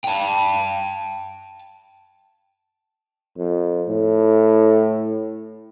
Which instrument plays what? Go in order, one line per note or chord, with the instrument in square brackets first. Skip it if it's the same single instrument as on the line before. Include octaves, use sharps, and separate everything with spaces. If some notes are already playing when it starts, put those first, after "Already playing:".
[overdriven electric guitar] G5 A5
[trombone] F2
A2